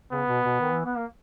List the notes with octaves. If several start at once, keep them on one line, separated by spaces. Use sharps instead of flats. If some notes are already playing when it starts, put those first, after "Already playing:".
C#3 B3
B2
B2
D#3
E3
B3
A#3